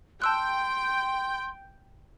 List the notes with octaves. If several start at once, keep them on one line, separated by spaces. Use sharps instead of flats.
G5 A5 C6 E6 F#6